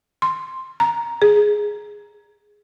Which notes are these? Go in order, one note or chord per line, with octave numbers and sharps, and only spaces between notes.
C6
A#5
G#4